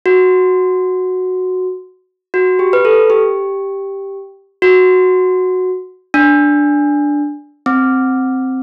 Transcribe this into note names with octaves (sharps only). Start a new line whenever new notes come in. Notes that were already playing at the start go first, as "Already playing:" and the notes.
F#4
F#4
G4
B4
A4
G4
F#4
D4
C4